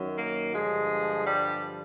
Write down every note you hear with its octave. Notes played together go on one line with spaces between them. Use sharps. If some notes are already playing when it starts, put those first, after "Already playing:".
Already playing: F#2 D#3 F#3
A#3
G2 D3 F3 G#3
G3